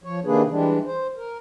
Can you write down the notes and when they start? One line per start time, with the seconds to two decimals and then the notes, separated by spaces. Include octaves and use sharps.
0.04 F3 C#5
0.25 C3 D#3 A#3 D4 G#4 B4
0.50 E3 G3 G#3 D4
0.86 C5
1.16 A#4